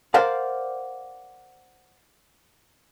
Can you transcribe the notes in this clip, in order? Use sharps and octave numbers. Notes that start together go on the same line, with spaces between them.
A#4 C5 D5 F5 F#5